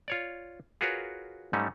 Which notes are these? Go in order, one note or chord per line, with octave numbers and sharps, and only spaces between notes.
F4 C#5 D5
F4 F#4 G#4 A#4 B4 C#5
G#2 G3 A3 C#4 D#4